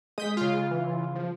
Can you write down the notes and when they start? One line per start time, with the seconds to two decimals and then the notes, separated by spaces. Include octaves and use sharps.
0.18 G#3 D#6 G6 B6
0.37 C#3 F4
0.71 E3
1.15 F3